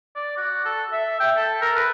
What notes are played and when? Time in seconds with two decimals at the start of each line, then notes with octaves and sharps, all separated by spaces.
0.16 D5
0.37 F#4
0.66 A4
0.93 E5
1.20 G5
1.37 A4
1.62 A#4
1.76 B4